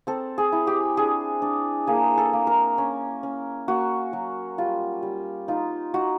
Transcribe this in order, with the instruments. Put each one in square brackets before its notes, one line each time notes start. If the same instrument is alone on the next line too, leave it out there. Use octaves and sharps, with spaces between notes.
[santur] C4 A4
G#4
E4
G4
D4 G#4
D4
A#3 G#4
A4
A#3
A#4
C#4
C#4
A#3 F#4
F#3
G3 F4
G3
D#4 F4
D#4 F#4